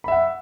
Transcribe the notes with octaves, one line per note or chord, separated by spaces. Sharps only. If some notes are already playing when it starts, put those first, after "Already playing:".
E5 F#5 B5